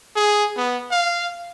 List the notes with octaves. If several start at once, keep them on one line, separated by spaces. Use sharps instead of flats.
G#4
B3
F5